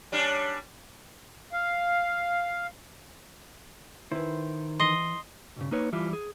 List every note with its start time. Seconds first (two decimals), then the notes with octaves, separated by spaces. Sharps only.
0.12 G3 C#4 D4
1.53 F5
4.12 D#3 E4 B4 C5
4.80 E3 D#5 C6 C7 G7
5.56 B1 G2 C#3
5.71 A#3 D#4 B4 C#5
5.92 E3 G3 E4 F4
6.13 G#4